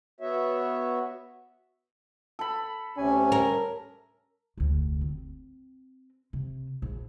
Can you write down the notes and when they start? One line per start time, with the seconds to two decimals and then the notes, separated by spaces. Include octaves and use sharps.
0.20 B3 F#4 C#5 E5
2.39 A4 B5
2.98 D2 C3 C#4 G#5
3.32 A#4
4.58 F1 D2
5.01 C4
6.33 C3
6.82 A#1